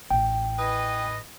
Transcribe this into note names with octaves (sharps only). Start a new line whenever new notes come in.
A1 G5
E3 B4 D#5